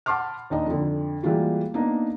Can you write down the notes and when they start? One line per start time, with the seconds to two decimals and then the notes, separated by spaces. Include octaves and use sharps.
0.06 F#5 A5 B5 C6 D6 F6
0.50 D#2 D4 D#4 D#5
0.66 F2 D3
1.23 E3 G3 G#3 A#3 F4 F#4
1.74 A#3 B3 D4 D#4